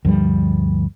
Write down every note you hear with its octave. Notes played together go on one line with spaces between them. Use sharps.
D2 G2 F3 G3